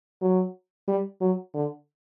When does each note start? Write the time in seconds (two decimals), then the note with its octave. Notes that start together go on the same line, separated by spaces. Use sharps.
0.21 F#3
0.88 G3
1.21 F#3
1.54 D3